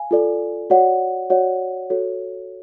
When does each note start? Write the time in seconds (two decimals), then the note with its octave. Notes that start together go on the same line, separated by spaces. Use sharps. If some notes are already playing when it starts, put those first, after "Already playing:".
Already playing: F5 G#5
0.11 F4 A4 D5
0.70 F#4 C#5 D5 F#5
1.30 F#4 C#5 D5 F#5
1.90 F#4 A4 C#5